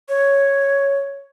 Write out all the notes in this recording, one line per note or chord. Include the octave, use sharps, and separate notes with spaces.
C#5